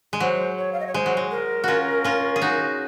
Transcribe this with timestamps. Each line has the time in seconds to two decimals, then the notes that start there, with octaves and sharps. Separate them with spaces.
0.13 G#3
0.20 F#3 C5
0.58 C#5
0.73 F5
0.80 D#5
0.87 C#5
0.94 G#3 C5
1.06 F#3
1.17 G#3
1.31 A#4
1.64 C#4 F4 F#4
2.04 C#4 F4
2.36 G#4
2.42 D#4 F#4